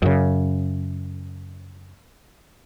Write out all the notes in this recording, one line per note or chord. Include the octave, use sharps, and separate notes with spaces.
F#2 C#3